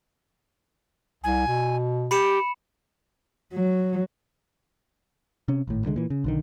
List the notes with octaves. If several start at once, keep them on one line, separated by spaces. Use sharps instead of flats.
C2 G#5
B2
G4 B5 C#7 E7
F#3
C3 C#4
G#1 A2
C2 D3 E3 G#3
A#2 E3
C#3
B1 D3 D#3